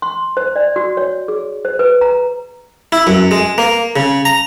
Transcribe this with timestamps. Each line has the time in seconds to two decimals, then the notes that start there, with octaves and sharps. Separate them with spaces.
0.02 C6
0.37 C5
0.56 D5
0.76 F#4
0.97 C#5
1.28 G#4
1.65 C5
1.79 B4
2.01 A#5
2.92 E4
3.07 F#2
3.31 G#3
3.58 A#3
3.96 C#3
4.25 A#5